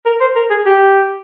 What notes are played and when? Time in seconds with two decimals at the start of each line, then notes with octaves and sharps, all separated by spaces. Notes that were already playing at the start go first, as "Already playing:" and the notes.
0.06 A#4
0.20 C5
0.36 A#4
0.51 G#4
0.66 G4